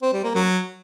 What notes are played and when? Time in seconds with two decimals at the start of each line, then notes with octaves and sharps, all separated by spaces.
0.02 C4
0.13 G3
0.24 A#3
0.35 F#3